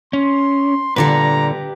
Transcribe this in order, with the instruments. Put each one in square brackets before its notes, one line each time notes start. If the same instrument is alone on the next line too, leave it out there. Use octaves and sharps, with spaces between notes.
[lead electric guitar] C#4 [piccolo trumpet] C6
[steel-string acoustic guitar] A#2 D3 G3 [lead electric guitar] G4 B4 [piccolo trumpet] A#5